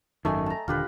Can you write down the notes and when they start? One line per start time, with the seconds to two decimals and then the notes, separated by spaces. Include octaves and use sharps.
0.25 G#1 F#2 D#3 A3 D#5 G#5
0.46 A5 A#5
0.68 D#1 D3 F4 G4 B4